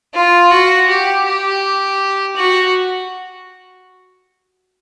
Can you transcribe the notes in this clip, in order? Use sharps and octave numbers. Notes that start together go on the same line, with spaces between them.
F4
F#4
G4
G4
F#4